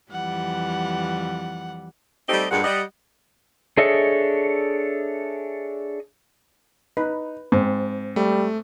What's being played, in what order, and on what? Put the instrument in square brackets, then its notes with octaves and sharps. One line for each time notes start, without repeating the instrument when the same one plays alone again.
[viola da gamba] F2 E3 G3 [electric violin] F#5
[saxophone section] G3 A3 C4 D#4 G4 D#5
G2 A#2 G3 G#3 F#5
G3 D#5 F#5
[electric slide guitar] D4 G#4 A4 C#5 D#5 E5
[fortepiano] D#4 [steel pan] B4
[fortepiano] G#2 [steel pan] C4
[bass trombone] G3 [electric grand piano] A3